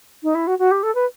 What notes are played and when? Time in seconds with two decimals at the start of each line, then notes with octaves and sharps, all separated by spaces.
0.23 D#4
0.35 E4
0.47 F#4
0.59 F#4
0.71 G4
0.83 A4
0.95 B4